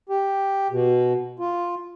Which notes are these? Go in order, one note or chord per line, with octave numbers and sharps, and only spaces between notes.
G4
B2
F4